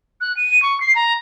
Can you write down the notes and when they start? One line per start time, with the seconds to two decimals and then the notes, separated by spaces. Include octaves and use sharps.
0.21 F#6
0.37 D#7
0.62 C#6
0.81 C7
0.95 A#5